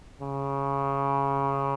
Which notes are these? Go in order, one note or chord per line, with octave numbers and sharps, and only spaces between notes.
C#3